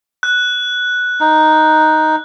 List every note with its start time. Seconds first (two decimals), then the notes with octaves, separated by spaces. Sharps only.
0.23 F#6
1.20 D#4